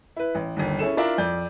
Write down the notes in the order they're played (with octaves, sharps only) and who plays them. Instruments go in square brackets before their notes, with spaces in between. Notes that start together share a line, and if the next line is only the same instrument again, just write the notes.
[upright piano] E4 B4
A1
G1 D#2
C#4 E4 G#4 A4 E7
D4 E4 F4 A#4 E5
F2 D5 G6